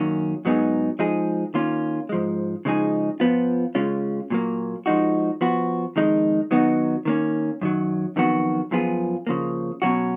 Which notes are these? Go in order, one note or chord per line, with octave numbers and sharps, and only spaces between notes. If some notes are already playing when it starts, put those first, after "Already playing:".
Already playing: F#2 D#3 F#3 A#3 C#4
G#2 F#3 B3 D#4 G#4
F3 G#3 D#4 G#4
D#3 A#3 C#4 F4
G#2 F3 G#3
C#3 F3 G#3 D#4 G#4
F3 B3 F4
C#3 G#3 C#4 F4
A#2 F#3 A#3
F3 G#3 D#4 F#4
F3 B3 F#4
F2 D#3 G#3 D#4
D#3 F#3 B3 D#4 F#4
D#3 A#3 C#4
F#2 D#3 F#3
F2 D#3 F#3 B3 F#4
F#2 F3 B3 F4 G#4
C#3 F3 A#3
B2 F#3 C#4 F#4